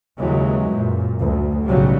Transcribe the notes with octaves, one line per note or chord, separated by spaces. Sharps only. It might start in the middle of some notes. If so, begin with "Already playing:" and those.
D#2 C#3 E3 F#3 G#3
F#2 A#2
D2
B1 A2 C#3 F#3 G3